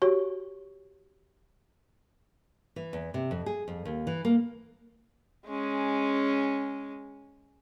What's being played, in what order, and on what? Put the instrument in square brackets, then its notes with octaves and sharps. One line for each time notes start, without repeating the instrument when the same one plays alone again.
[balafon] F#4 G4 C#5
[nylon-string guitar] E3
E2
C3
F2
G#4
F2
D#2
E3
A#3
[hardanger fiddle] G#3 C#4